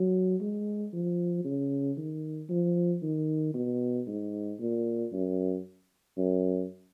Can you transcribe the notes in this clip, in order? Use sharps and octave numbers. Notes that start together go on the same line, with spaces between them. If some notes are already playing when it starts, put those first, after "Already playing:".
Already playing: F#3
G#3
F3
C#3
D#3
F3
D#3
B2
G#2
A#2
F#2
F#2